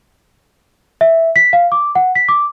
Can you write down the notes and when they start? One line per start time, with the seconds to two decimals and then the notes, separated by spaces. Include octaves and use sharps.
1.01 E5
1.36 B6
1.53 F5
1.72 D6
1.95 F#5
2.15 B6
2.29 D6